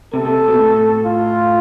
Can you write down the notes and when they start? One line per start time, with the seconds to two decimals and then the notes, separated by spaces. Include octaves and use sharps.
0.13 C3 A4
0.25 C3
0.48 B2
0.59 A2
1.05 F4